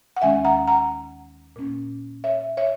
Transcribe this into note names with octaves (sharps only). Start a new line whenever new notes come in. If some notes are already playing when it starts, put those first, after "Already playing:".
F#5
D#2 D#3 G#3 C#4 E5 G#5
F#5 A#5
F#5 A#5
A#2 A#3 C#4
C#5 E5
C#5 E5